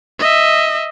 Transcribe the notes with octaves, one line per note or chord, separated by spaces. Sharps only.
D#5 E5